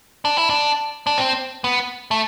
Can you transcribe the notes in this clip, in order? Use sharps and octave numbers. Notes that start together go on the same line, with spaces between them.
D4
E4
D4
D4
C4
B3
A3